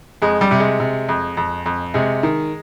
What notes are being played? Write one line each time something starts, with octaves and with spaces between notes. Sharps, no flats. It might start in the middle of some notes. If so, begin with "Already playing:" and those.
F2 G#3
G3
C3
G#3
C3
F2
F2
F2
C3 G#3
D#3